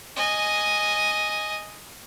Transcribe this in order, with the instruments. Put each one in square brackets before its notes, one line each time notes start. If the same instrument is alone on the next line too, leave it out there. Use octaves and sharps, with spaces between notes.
[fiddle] D#5 G#5